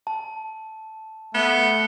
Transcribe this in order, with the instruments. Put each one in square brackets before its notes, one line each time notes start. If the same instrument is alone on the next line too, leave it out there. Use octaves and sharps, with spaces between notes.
[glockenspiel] A5
[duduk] A3 [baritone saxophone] B3 [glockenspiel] C#7 G7